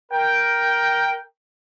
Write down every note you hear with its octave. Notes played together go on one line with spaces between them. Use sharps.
A#4 G5